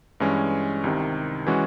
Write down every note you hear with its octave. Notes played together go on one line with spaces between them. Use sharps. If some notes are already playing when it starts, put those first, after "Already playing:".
G2 E3 G#3 C#4
C2 C3 D#3
E3 G#3 C#4 F#4